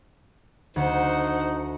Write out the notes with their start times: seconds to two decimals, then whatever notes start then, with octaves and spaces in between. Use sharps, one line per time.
0.76 D2 D#4 C5 F#5